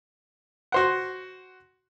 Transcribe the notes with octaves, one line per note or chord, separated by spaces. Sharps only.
F#4 C5 F#5